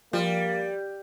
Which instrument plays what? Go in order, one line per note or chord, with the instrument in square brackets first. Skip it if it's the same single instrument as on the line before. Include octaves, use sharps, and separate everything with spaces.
[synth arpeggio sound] F3 [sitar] G3 [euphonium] A#3